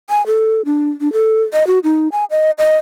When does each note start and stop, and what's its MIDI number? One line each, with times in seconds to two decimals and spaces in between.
0.10 0.25 80
0.27 0.62 69
0.65 0.90 62
1.01 1.11 62
1.13 1.42 69
1.53 1.66 75
1.67 1.79 66
1.84 2.08 63
2.12 2.25 80
2.31 2.51 75
2.58 2.76 75